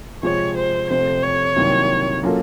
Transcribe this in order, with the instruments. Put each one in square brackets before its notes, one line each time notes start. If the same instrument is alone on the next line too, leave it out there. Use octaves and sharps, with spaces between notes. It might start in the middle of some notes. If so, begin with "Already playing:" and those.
[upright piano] C3 F3 G#3 C4 F4 [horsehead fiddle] C#5
[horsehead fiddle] C5
[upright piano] F2 C3 F3 A3 C4 [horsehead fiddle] C5
[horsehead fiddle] C#5
[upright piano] C2 C3 D#3 F#3 A#3
F#3 A#3 C#4 F4 A4